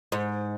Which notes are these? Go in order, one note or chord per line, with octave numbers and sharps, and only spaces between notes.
G#2